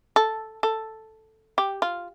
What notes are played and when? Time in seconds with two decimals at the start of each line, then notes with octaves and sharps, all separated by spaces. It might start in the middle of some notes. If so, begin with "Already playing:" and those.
0.16 A4
0.63 A4
1.58 G4
1.82 F4